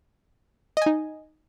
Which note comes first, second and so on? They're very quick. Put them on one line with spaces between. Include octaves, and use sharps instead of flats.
D#5 G#5 D#4